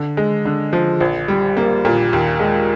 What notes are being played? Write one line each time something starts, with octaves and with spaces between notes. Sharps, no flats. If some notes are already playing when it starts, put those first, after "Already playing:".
Already playing: D3
G#3
D3
F3
A#1
G3
A#3
A#2
D#2
G#3